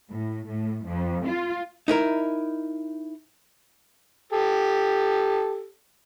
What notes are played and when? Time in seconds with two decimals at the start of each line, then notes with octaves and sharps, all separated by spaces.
0.12 A2
0.48 A2
0.86 F2
1.27 F4
1.88 D#4 E4 A#4
4.33 G4 A4